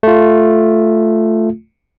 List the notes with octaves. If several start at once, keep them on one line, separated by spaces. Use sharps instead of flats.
A3 F4